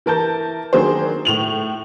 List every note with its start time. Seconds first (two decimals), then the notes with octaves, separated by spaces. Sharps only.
0.06 E3 A#4 A5 G6
0.73 D#3 F#3 D4 G#4 C5
1.25 A2 F7 F#7